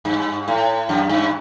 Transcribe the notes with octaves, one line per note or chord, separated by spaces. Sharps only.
G2
A2
F#2
G2